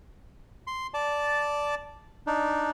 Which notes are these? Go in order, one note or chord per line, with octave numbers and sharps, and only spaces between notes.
C6
D5 A5
D4 D#4